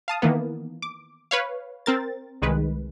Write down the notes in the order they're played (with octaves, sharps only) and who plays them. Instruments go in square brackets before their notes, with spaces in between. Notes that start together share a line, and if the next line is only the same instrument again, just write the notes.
[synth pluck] F5 A5 D#6
D#3 E3 A#3 B3
D6
B4 C#5 F5
C4 A#4 A6
C2 D#3 G#3 B4